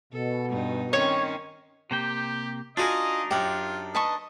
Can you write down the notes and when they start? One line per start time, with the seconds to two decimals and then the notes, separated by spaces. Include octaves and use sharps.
0.13 B2 A4
0.49 G2 D#4
0.93 D#3 C4 C#4 C#5
1.91 C3 A#3 G4 G5
2.77 D4 D#4 F4 F#4 G#4 A#4 D#5
3.31 F#2 F4 G4 F#5
3.95 B4 D#5 A5 C#6